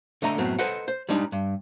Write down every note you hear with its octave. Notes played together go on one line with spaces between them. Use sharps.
D3 A3 D#5 A#5
F#2 A2 B3 C4
A4 B4 C5 D#5 F#5
C5
G3 G#3 D4 D#4
G2